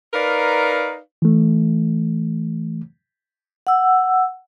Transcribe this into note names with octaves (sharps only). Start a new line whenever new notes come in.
D#4 A#4 B4 D5 F5
E3 A3
F#5 E6